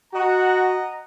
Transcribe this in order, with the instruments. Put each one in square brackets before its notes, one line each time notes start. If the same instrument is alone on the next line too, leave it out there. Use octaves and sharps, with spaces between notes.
[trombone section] F#4 [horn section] D#5 F#5 A#5